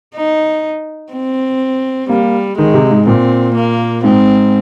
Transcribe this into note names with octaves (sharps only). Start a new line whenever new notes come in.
D#4
C4
G3 A#3
D#3 G#3
C3
G#2
A#2 C4
A#3
G#2 C4